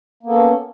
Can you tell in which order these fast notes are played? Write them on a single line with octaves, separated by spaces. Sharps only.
A#3 B3 A4 C#4